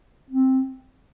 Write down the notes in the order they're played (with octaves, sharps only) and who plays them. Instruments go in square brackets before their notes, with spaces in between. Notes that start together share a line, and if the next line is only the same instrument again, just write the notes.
[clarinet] C4